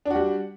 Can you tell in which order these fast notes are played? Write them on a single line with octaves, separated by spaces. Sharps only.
D4 F#4 G3